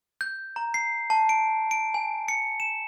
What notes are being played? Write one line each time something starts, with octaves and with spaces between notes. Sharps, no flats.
G6
A#5
C7
A5
D7
D7
G#5
C#7
E7